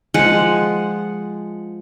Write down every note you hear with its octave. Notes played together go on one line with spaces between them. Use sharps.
F3 G#3 F#5